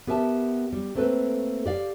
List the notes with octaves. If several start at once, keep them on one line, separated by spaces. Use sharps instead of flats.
B3 G4 A#4 E5 G#5 A5
G3
A3 A#3 C4 A4 B4
G4 D5 F5